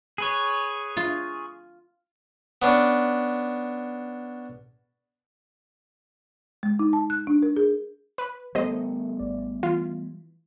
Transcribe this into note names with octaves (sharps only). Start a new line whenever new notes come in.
G#4 B4 C#5
F4
B3 C#4 D4
G#3
D#4
A5
F#6
D4
A#4
G#4
B4
G3 A3 B3 G4 A4 A#4 C5 D#5
G#1 D5
E3 F4